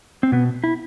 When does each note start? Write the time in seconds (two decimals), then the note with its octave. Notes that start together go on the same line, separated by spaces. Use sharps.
0.23 C4
0.32 B2 B3
0.64 E4